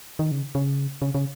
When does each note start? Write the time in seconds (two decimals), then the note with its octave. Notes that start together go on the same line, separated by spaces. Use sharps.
0.19 D#3
0.31 C#3
0.55 C#3
1.02 C#3
1.15 C#3